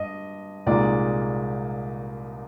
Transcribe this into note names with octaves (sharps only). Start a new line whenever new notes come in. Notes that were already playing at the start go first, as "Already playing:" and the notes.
Already playing: G2 D#5
C2 A#2 G#3 D#4 D5